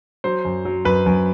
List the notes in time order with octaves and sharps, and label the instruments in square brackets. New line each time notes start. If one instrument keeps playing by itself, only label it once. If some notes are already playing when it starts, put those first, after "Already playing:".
[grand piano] F#3 C5
F#2
F#3
F#2 B4
F#2